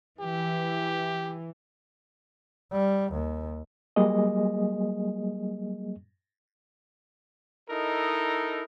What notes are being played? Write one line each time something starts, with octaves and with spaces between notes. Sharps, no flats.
E3 G4
G3
D#2
F#3 G3 A#3 G#4 D#5
D#4 E4 A4 A#4 D#5